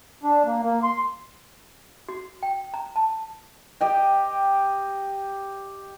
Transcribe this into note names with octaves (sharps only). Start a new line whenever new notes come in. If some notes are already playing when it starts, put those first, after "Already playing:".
D4
A#3
A#3
C6
F#4
G5
A#5
A5
G4 D#5 G5